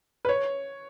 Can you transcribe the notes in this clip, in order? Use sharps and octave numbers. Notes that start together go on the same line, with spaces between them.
B4
C#5